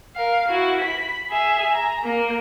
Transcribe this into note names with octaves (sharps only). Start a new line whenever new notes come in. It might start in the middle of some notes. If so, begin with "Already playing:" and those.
A#4 F5
E4 F#4
B5 B6
G#4 E5
A#5
A#3